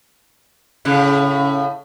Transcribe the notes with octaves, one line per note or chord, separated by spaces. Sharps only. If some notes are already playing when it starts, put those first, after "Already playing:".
A2 C#3